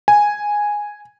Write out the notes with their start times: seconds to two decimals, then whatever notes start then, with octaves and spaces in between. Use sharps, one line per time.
0.08 G#5